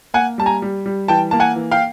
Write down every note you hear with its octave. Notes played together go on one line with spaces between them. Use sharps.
A#3 F#5 G#5
G3 A5
G#5 A#5
G3
G3
E3 G5 A5
A#3 A5
F#5 G#5
E3
F5 G5